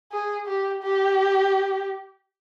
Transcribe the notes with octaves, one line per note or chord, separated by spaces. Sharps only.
G#4
G4
G4